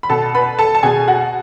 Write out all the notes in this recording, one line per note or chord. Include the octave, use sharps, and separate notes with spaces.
B5
B2 A4 A5
B4 B5
A4 A5
A5
B2 G#4 G#5
F#4 F#5